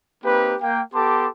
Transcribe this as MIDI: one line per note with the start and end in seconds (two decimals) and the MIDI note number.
0.24 0.55 58
0.24 0.55 60
0.24 0.55 63
0.24 0.55 67
0.24 0.55 71
0.61 0.81 58
0.61 0.81 79
0.94 1.28 59
0.94 1.28 67
0.94 1.28 69
0.94 1.28 81
0.94 1.28 84
0.94 1.28 86